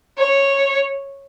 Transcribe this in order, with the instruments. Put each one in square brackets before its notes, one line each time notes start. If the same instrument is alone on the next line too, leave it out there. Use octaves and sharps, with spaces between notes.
[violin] C#5